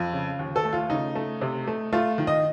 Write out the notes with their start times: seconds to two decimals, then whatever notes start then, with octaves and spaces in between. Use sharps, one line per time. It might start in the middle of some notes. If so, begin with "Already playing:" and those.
Already playing: F2 F4
0.13 C#3
0.39 D#2
0.56 A4
0.65 A3
0.73 F4
0.90 C#3 D#4
1.15 A3
1.41 C3
1.67 A3
1.92 A3 F4
2.18 D#3
2.27 D#5